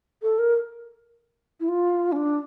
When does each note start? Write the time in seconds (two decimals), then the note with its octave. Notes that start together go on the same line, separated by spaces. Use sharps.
0.22 A4
0.39 A#4
1.60 E4
1.68 F4
2.12 C#4
2.16 D4